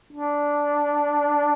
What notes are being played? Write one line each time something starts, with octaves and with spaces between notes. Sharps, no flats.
D4